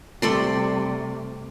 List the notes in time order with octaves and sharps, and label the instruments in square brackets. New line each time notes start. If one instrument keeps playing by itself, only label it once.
[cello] C3 G3 [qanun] A3 D5 C6